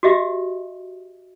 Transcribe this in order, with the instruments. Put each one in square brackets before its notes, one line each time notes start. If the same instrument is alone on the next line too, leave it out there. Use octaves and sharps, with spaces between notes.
[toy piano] F#4 G4 D#5 E5